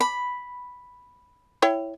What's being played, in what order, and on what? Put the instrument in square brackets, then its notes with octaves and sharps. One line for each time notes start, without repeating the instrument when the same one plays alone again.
[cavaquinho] B5
[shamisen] E4 C#5 G5